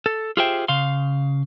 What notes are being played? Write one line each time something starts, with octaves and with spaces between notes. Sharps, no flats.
A4
F4 G4 G#4 C5 E5 G5
C#3 F5 C6